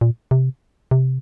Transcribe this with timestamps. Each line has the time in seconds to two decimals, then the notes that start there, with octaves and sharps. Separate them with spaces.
0.01 A#2
0.31 C3
0.91 C3